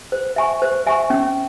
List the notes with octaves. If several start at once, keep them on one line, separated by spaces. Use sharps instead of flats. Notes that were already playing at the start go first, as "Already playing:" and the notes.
C5
E5 G#5 C#6
C5
E5 G#5 C#6
C#4